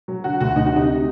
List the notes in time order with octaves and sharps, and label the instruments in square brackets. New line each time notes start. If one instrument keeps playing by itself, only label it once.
[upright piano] F#3
[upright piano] D3 [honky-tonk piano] F#4
[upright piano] D2 [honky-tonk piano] F#4
[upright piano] D2 [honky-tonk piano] D#4
[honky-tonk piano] F#4
[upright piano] C3 [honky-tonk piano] D#4
[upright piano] C3